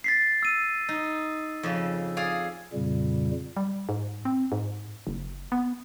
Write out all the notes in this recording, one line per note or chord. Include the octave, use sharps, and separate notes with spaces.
A6 B6 C7
E6 D#7
D#4
F2 C#3
G#4 D5 F5
F2 A#2 C#3 G3
G3
G#2
C4
G#2
F#1
B3